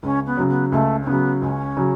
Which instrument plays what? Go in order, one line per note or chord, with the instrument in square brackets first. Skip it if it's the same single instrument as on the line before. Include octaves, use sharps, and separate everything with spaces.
[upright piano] C#2 [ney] C#4
[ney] B3
[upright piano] C#3 F#3
[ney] B3
[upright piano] C#2 [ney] A3
[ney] C#4
[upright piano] C#3 F#3 [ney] B3
[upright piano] C#2 [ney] C#4
[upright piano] C#3 F#3